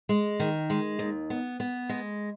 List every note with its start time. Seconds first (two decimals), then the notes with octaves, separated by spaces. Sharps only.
0.09 G#3
0.40 D#3
0.70 G#3
0.99 D#2
1.30 B3
1.60 B3
1.89 G#3